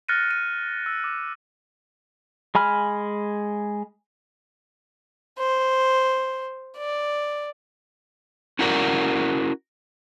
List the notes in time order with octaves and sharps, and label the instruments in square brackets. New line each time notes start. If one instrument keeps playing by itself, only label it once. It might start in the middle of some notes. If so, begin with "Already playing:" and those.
[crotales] F6 F#6 A6 A#6 C#7 D#7
D#7
E6
D6 F6
[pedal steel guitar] G#3 G#5 B5 F6
[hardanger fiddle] C5
D5
[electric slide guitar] C#4 E4 F#4 A#4 D5